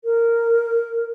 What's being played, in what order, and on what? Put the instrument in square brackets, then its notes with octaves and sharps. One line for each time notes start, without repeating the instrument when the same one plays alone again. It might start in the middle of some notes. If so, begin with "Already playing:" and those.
[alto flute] A#4